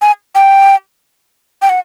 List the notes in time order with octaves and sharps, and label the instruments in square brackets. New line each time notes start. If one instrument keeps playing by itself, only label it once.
[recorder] G#5
G5
G5
F#5